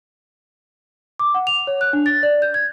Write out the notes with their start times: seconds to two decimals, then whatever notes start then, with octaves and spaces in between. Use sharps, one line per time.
1.19 D6
1.34 F#5
1.47 F7
1.67 C#5
1.81 F#6
1.93 D4
2.06 A6
2.23 D5
2.42 G6
2.54 G#6